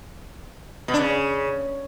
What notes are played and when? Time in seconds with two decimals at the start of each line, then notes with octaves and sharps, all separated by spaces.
0.88 B2
0.93 D4
0.99 C#3